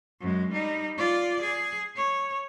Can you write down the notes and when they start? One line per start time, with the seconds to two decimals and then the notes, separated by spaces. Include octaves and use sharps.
0.21 F#2 G#3
0.52 G3 D#4
0.98 F4 D5
1.42 G#4
1.96 C#5